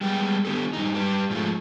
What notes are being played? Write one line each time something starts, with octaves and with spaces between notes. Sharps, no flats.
G3 G#3 B3 G5
D3 D#3 B3 G4 A4
G2 D#4
G3 G4 B4
G#2 F3 G#3 A3